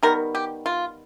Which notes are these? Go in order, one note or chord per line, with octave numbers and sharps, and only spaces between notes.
D#3 G3 B3 A#4
G4
F4